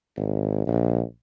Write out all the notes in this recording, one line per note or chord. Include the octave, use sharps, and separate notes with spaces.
G#1
A#1